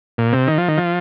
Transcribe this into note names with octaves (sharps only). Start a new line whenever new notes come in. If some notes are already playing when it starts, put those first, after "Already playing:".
A#2
C3
D#3
F3
D#3
F3